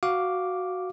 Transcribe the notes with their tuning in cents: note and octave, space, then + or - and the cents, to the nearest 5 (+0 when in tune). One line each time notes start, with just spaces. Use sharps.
F#4 +0 F5 +0 D6 -5